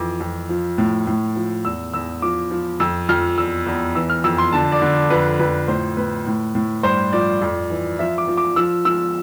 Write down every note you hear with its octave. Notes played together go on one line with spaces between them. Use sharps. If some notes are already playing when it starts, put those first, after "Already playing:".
Already playing: F2 E3 D6
F2
F3
A2
A2
F3
E2 E6
E2 E6
F3 D6
F3
F2 E6
F2 F6
E2 E6
E2
E3 E6
F6
F2 E6
C6
D3 A5
D5
D3
F2 B4
F2 B4
A2 C5
A2 B4
A2
A2
G2 C5
F3 D5
F2
E3
F3 E5
D6
F3
D6
F3 E6
F3 E6